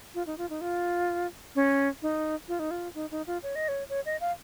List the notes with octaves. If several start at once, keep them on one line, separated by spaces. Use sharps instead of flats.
F4
D#4
F4
D#4
F4
C#4
D#4
F4
D#4
F4
D#4
D#4
F4
C#5
D#5
C#5
C#5
D#5
F5